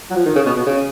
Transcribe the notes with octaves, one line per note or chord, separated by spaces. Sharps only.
F#3
F3
D#3
C#3
B2
B2
C#3